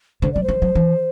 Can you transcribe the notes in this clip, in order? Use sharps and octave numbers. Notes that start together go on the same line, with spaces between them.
D3 C5
F#3 D5
C5
E3
F#3
E3